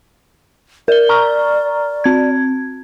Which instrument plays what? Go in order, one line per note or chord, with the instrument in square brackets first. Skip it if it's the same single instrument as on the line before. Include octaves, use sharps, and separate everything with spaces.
[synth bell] A#4 G7 [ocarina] D5
[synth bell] A#5 C#6 F6
C4 G#6